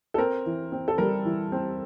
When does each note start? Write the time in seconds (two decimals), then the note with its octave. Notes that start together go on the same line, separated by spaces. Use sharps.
0.14 A4
0.18 C4 A#4
0.46 E3
0.72 C4
0.88 A4
0.98 G3 A#4
1.25 E3
1.52 C4